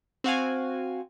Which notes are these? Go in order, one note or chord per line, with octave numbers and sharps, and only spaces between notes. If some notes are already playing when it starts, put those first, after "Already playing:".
C4 F#4 F5 G#5